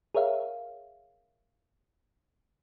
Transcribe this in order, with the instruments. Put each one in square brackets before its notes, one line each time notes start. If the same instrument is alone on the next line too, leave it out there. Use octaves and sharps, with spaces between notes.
[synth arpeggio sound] G#4 A#4 C#5 E5 F5